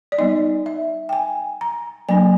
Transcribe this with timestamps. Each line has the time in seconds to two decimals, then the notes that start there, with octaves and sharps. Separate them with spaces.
0.12 D5
0.18 G3 B3 D#4 D#5
0.66 E5
1.09 G5
1.13 G#5
1.61 A#5
2.09 F#3 A#3 D4 G#5